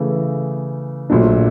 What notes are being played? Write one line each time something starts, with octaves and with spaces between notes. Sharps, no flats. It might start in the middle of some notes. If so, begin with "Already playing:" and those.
Already playing: C#3 E3 A3
A#1 A#2 F#3 A3 D4